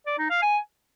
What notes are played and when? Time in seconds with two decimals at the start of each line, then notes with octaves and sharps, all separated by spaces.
0.07 D5
0.18 D#4
0.30 F5
0.42 G#5